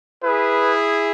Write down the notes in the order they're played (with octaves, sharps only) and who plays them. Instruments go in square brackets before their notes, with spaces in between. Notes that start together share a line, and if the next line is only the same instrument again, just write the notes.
[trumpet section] E4 G#4 [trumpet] B4